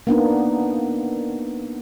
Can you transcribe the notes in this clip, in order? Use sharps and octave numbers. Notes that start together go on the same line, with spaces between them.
A#3 B3 D4 D#4